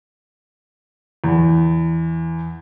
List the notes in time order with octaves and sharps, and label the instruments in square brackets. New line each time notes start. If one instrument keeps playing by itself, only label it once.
[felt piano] E2